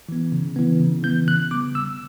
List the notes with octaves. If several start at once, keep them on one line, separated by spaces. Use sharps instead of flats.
E3 B3
C#3
E3 B3
C#3
E3 B3 G6
C#3 F#6
G3 B3 D6
C#3 E6